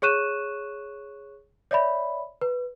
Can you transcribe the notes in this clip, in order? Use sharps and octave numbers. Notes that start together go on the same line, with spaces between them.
G#4 C#5 C#6 F#6 D#7 E7
C#5 D5 E5 B5
B4